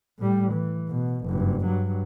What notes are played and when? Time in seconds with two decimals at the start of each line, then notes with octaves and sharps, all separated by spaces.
0.19 A2 G3
0.53 E3
0.89 B2
1.26 F#1 G2
1.65 G2 F#3